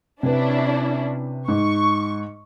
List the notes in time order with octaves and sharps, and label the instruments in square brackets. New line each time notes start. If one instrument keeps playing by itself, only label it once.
[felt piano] C3 B4 [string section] C#4 D4 E4
[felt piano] G#2 [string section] C#6